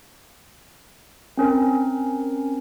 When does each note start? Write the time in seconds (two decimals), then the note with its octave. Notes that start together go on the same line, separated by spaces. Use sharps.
1.37 C4 C#4 A#4